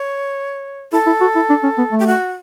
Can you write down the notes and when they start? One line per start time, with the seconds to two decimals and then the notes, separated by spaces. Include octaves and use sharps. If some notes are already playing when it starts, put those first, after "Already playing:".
Already playing: C#5
0.92 E4 A4
1.06 E4
1.21 F#4
1.35 E4
1.49 D4
1.63 C#4
1.78 B3
1.92 A3
1.99 G4
2.07 F#4